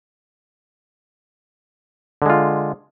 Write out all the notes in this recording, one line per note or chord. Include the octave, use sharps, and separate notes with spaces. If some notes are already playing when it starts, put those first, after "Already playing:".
D3 G#3 F4